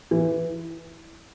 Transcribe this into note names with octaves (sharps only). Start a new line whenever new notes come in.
E3